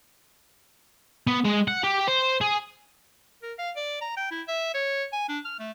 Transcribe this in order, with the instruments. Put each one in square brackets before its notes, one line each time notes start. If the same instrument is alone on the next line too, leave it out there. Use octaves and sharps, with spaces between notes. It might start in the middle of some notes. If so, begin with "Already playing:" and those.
[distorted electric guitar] B3
G#3
F#5
G4
C5
G#4
[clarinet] A#4
F5
D5
A#5
G5
E4
E5
C#5
G#5
D4
F6
A3